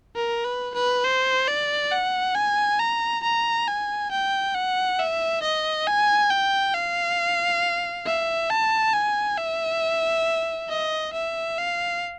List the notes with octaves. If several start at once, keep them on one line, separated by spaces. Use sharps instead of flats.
A#4
B4
B4
C5
D5
F#5
G#5
A#5
A#5
G#5
G5
F#5
E5
D#5
G#5
G5
F5
E5
A5
G#5
E5
D#5
E5
F5